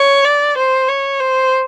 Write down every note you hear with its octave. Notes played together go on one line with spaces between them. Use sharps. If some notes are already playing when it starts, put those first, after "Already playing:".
Already playing: C#5
D5
C5
C#5
C5